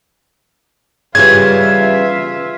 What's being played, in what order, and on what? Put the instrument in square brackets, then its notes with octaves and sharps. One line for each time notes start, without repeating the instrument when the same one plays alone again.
[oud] C#3 E3 G3 [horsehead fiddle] F4 E5 [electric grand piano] G#6